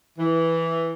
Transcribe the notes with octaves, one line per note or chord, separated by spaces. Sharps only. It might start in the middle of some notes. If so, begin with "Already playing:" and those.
E3